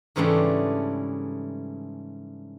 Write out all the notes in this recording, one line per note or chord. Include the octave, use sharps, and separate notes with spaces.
G#2 C#3 E3 G3 A3 D4